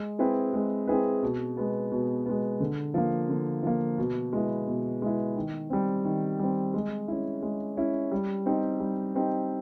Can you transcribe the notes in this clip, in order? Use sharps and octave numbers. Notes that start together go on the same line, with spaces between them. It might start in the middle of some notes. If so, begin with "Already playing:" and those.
Already playing: G#3
C4 E4 G#4 B4
G#3
C4 E4 G#4 B4
B2
G#3 B3
B2
G#3 B3
D3
F3 A#3
D3
F3 A#3
B2
G#3 B3 E4
B2
G#3 B3 E4
D#3
G3 C4
D#3
G3 C4
G#3
C#4 E4
G#3
C#4 E4
G3
C4 D#4 G4
G3
C4 D#4 G4